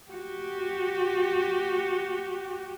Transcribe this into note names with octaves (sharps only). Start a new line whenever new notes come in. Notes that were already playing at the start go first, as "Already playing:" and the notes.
F#4 G4